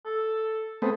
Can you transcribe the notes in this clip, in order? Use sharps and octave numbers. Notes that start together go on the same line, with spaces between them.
A4
A3 B3 C4 G#4